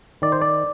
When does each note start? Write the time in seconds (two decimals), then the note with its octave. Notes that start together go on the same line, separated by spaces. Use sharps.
0.22 D#3 D5
0.32 C5
0.42 D5